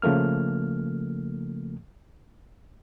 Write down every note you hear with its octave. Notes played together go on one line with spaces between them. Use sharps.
C#3 F3 A3 A#3 F6